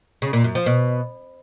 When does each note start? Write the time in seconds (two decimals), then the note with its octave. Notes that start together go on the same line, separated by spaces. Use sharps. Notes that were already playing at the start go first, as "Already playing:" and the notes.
0.22 C#3
0.33 A#2
0.44 F#2
0.55 F3
0.66 B2